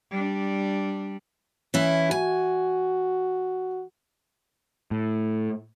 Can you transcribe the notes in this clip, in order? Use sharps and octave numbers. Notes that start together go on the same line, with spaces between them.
G3 D4
E3 C#4 E4
F#4 G#5
A2